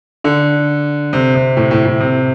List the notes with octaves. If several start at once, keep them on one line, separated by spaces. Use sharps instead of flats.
D3
C3
C3
A2
A2
A2
C3